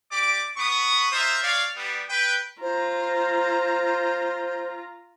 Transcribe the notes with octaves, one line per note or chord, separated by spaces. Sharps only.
G4 D5 D6
B3 B5 C#6 D#6
D#4 F4 C5 E5
C#5 D5 F5
G3 B3
B4 G5
F4 C5 A#5